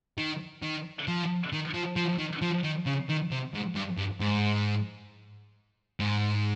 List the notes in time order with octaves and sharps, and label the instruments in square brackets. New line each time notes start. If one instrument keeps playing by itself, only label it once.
[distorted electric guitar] D#3
D#3
F3
D#3
F3
F3
D#3
F3
D#3
C#3
D#3
C3
G#2
G2
G2
G#2
G#2